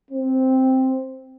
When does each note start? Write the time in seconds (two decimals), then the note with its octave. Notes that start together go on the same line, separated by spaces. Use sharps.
0.11 C4